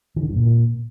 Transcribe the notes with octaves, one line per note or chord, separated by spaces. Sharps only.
D#3
D3
G2
A#2